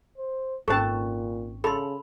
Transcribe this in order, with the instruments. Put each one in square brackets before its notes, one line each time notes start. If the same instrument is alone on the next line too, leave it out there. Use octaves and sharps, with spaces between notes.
[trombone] C5
[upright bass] G#1 [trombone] A#2 [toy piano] C#4 C5 C#6 [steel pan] A4 A5
[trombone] C#3 [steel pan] A4 [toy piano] B5 C6